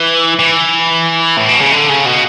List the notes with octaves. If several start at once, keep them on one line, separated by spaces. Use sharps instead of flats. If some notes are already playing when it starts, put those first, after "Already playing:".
Already playing: E3
E3
A2
B2
C#3
D3
C#3
B2